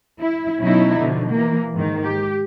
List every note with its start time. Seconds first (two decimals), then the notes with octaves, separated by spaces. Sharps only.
0.20 E4
0.60 B2 F#3 C#4 D#4 E4
1.00 B2 D3 F3
1.31 E3 A#3
1.73 G#2 D#3
2.03 G4